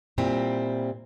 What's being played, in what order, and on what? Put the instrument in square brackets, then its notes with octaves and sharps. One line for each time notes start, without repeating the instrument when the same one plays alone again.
[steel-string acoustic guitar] A#2 G3 C4 E4